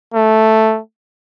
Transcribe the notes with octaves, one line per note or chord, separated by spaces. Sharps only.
A3